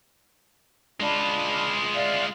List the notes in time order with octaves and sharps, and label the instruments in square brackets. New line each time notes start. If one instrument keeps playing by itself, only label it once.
[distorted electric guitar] G#3 F4 [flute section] D4 B5
[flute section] D5 E5 F5